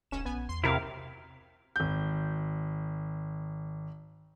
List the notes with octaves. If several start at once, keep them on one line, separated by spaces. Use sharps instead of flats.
D#1 B1 C#4 E7
A#1 B3 G#5
E2 C6
F#2 C3 E4 A#4 F5
G#1 G6